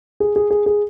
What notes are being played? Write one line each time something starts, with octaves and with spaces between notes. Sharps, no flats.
G#4
G#4
G#4
G#4